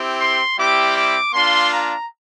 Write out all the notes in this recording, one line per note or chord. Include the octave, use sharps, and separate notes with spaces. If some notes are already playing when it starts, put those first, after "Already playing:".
Already playing: C4 E4 G4
C6
G3 C4 E4 G4 D6
D6
A#3 D4 F4 C6
A#5